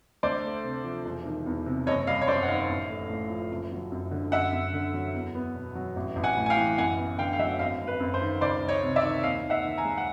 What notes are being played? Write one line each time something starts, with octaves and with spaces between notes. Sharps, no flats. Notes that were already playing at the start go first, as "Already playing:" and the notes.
D2 C5 D5
A3
C3
F3
E1
D#3
E2
C3
F#1 C#5 D#5
G3 D#5 F5
C#5
F#2 C5 D5
F#5
D#3 D#5 F5
A1
A3
A2
F3
F#1
F#3
F#2
D3
F#2 E5 F#5
F#2
D3
F#3
E2
B3
B2
F#3
A1
A1
F#5 G#5
A2
G#5
F5 G5
E3
F#2 F#5 G#5
B3
D3 F5 G5
F5
F#3 E5 F#5
G#1 D#5 F5
G#1
B4
F#2
C5
D#3
C#2 C5 D5
C#2
C#5 D#5
C3
D5 E5
D#3
D#2 D#5 F5
D#2
E5 F#5
D#3
G#5 A#5
G#3
F#5